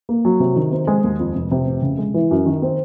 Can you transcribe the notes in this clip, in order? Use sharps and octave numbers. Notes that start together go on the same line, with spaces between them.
A#3
F#3
C3
D#3
C4
G#3
D#2
F2
F1
C3
F1
C#3
G#3
E3
F#2
D#3
C4